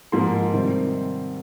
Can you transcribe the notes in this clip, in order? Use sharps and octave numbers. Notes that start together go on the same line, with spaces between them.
G#2 F3 A#3 C6
C3 D#3 G3 C4